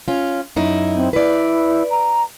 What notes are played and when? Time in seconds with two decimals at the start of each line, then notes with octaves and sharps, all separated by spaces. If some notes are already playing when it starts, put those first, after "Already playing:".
0.08 C#4 F4
0.56 F#2 D#4 E4
0.95 C4
1.13 E4 B4 D5
1.90 A#5